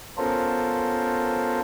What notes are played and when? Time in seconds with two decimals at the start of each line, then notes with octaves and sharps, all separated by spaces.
0.18 B3 C#4 F4 A4 A#4 C5